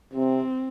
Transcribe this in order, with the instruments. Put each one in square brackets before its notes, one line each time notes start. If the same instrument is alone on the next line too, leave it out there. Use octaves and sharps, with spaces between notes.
[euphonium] C3 [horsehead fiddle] C4